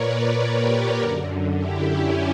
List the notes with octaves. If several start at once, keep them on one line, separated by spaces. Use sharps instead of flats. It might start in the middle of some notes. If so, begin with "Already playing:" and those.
Already playing: A#2 A#4 B4 C#5 D5
A#4 C#5
G4 B4
F#2 D3 F#4 A#4
E4 G4
C#4 E4